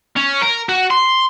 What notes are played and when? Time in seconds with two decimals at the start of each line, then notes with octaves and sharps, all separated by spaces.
0.17 C#4
0.42 A#4
0.69 F#4
0.90 C6